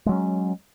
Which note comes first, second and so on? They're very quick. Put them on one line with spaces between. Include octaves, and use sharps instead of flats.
G#3 F#3 C#4